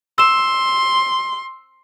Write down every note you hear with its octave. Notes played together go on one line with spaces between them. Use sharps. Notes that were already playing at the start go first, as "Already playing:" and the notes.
C6 E6 E7